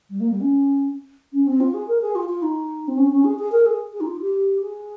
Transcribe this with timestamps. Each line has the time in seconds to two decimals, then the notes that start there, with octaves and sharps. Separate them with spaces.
0.10 G3
0.20 A#3
0.30 G3
0.41 C#4
1.33 C#4
1.47 C4
1.60 F4
1.74 G#4
1.88 A#4
2.02 G#4
2.15 F4
2.29 F4
2.43 D#4
2.88 C4
2.97 C#4
3.11 C#4
3.25 G#4
3.39 G#4
3.52 A#4
3.66 G#4
3.93 G#4
4.01 D#4
4.07 F4
4.21 G4
4.62 G#4